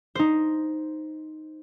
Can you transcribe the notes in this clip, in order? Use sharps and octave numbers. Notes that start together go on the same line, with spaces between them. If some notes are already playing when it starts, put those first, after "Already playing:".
D#4 C5